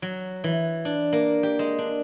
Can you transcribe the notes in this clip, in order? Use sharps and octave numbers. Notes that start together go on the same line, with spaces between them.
F#3
E3
D4
A#3
G4
G#3
D4